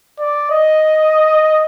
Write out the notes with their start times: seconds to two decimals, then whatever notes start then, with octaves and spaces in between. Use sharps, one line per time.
0.20 D5
0.51 D#5